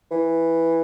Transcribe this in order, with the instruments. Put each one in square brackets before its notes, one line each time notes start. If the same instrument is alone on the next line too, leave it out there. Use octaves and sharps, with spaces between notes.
[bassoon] E3